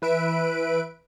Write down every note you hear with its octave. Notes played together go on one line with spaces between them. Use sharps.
E3 B4 E5 D7